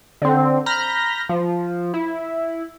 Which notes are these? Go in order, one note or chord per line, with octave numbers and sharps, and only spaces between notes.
D3 C4
A#5 B5 F6 G6 A#6
F3
E4